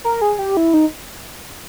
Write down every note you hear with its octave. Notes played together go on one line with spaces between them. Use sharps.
A#4
G#4
G4
E4
D#4